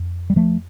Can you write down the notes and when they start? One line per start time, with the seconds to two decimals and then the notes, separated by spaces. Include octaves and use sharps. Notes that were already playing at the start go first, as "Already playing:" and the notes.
Already playing: F2
0.30 G3
0.36 F3 A3